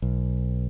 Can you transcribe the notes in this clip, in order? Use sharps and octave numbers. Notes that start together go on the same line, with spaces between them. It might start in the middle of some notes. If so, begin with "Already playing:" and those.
B1